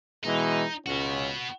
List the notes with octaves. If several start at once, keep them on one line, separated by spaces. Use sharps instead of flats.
B2 E3 G#3 D#4
C#2 B3 C#4 F#4